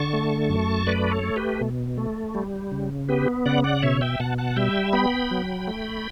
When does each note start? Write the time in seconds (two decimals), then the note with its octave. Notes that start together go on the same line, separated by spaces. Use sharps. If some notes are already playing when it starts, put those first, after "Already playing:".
Already playing: D3 A5 C#6
0.13 A3
0.50 F#2
0.87 A3 B4 D5
1.12 A4 C#5
1.23 A3
1.36 G4 B4
1.61 B2
1.98 A3
2.35 G3
2.72 C#3
3.09 B3 G4 B4
3.46 C#3 D5 F#5
3.64 D5 F#5
3.82 B2 C#5 E5
4.01 E5 G5
4.20 B2 F#5 A5
4.38 F#5 A5
4.56 G3 E5 G5
4.93 B3 G5 B5
5.31 F#3
5.67 A3